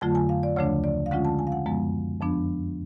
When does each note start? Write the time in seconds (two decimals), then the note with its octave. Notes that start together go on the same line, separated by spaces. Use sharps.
0.01 F2 D3 F#3 A3 F4 A5
0.15 G#5
0.29 F5
0.43 D5
0.56 D2 C#3 F3 A3 D4 C#5
0.84 D5
1.06 F5
1.11 D3 G#3 C#4 F4 F#5
1.25 A5
1.39 G#5
1.47 F5
1.52 F#5
1.66 F#2 F3 G#3 B3
2.21 F2 F3 B3 D4